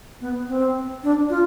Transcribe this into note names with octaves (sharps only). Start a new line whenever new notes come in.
B3
C4
D4
F4